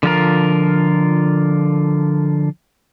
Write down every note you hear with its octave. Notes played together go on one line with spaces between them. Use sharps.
D3 F3 F4 A#4